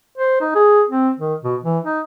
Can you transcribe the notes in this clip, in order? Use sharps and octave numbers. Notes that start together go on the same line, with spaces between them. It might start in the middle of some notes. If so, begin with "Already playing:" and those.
C5
D#4
G#4
C4
D#3
B2
E3
D#4